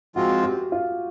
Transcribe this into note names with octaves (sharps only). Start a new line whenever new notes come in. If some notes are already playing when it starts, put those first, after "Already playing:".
F3 G#3 C4 F4 F#4
G4
F4